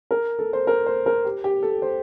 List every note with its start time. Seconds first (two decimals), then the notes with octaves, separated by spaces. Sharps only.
0.11 A#4
0.39 A4
0.53 C5
0.67 A#4
0.86 C5
1.06 A#4
1.25 G4
1.44 G4
1.63 A4
1.82 C5